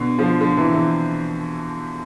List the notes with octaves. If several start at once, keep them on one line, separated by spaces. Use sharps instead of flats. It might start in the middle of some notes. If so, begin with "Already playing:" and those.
Already playing: B2 D3
D3 F3
D3 F3
C3 E3
C3 E3